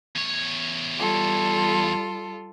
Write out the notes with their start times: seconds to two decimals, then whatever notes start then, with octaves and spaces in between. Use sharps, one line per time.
0.16 E2 C#5
0.97 G3 F4 A4